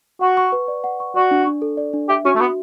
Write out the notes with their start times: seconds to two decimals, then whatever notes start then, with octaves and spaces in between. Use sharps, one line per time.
0.21 F#4 F#5
0.37 C#6
0.52 B4
0.68 D5
0.84 F#5
1.00 C#6
1.16 F#4 D5
1.31 D4
1.47 D4
1.62 A4
1.77 D5
1.93 D4
2.09 G4 E5
2.25 C#4 F#4
2.36 A3
2.40 B3 F#4